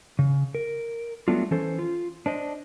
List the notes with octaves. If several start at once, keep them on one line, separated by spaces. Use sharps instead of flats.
C#3
A#4
F#3 G3 A3 B3 D4 F4
E3 C#4 A4 C5
F4
D4 C5 D#5